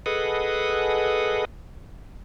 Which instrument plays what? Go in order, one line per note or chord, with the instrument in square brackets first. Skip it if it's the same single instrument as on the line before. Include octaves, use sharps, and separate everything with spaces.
[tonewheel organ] G#4 A4 B4 D#5 F#5